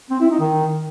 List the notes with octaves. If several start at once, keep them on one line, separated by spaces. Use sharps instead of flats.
C4
E4
D#4
D#3